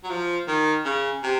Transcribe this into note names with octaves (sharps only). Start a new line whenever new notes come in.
F#3
F3
D#3
C#3
C3